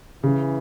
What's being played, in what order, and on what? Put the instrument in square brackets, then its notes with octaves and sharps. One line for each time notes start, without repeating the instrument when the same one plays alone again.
[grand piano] C#3 [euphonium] E3